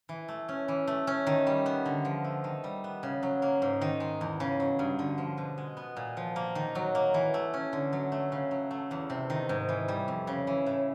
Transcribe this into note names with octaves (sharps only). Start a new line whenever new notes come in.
E3
A3
C#4
E3
A3
C#4
D#3
G3
B3
D3
F3
A3
D#3
G3
B3
C#3
F#3
A#3
G#2
D#3
G#3
E2
C#3
F#3
G2
D3
F3
B2
G#3
B3
A#2
F3
A#3
D#3
F#3
A#3
E3
A3
C#4
D3
F#3
A3
C#3
F#3
A3
E2
C3
D#3
G#2
E3
G3
F2
C#3
E3
A2